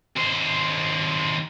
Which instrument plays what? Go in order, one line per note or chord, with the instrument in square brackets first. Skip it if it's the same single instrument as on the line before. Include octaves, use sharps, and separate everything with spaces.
[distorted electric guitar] D#2 C5